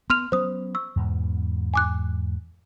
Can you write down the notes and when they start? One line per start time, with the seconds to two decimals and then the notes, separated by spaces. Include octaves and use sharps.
0.10 B3 C6 F6 F7
0.32 F#3 B3 C#4 C5 D#6
0.75 C#6 E6
0.96 E2 G#2 B2
1.74 G#5 D6 F#6